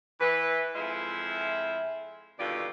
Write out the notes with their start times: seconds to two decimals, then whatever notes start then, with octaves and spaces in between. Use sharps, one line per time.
0.20 E3 B4
0.75 F2 G#3 E4 F4 E5
2.39 D#2 B2 D3 G3 F4 D5